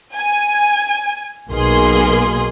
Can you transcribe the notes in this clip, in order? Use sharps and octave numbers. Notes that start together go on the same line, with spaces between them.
G#5
B1 B2 A#3 G#4 C6